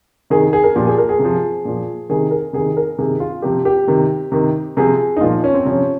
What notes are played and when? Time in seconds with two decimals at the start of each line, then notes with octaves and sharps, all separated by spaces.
0.30 C3 D#3 G#4
0.53 G#4
0.64 A#4
0.76 A#2 F3 G4
0.87 G#4
0.98 A#4
1.09 G#4
1.19 C3
1.25 F3
1.65 A#2 F3
2.09 C3 D#3 G#4
2.31 A#4
2.53 C3 D#3 G#4
2.77 A#4
2.98 C3 D#3 G#4
3.20 F4
3.42 C3 F3 G4
3.65 G4
3.87 C3 D#3
4.32 C3 D#3
4.77 C3 F3 G#4
5.17 D#4
5.21 A#2 F3 F4
5.44 C#4
5.54 C4
5.65 C3 F3 C#4